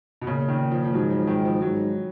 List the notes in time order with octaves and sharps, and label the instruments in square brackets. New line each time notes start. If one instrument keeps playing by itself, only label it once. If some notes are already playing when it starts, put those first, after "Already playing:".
[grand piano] B2
[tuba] A#2 [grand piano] C#3
[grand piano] D#3
F3
F3
[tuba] G#2 [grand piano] F#3
[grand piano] F3
D#3
F3
[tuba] G#2 [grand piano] F#3